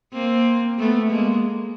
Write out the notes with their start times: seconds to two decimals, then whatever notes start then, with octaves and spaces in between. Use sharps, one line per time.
0.13 A#3 C4
0.79 A3 B3
1.11 G#3 A#3